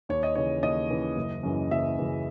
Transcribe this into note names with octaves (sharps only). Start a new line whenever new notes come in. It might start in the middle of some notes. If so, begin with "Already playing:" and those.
D#2 C#5
D#5
C#3 E3 C#5
D#2 D#5
C#3 E3
F#1
F#2 C#3 E3
F#1 E5
F#2 C#3 E3